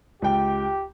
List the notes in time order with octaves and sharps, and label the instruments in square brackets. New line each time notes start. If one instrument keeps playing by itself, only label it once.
[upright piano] C#2 G5 [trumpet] G4